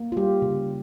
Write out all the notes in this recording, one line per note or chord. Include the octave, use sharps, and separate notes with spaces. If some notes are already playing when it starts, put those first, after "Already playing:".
Already playing: A#3
F4
G3 G4
C#3